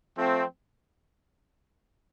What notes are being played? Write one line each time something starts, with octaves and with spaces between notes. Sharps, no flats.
F3 A3 C4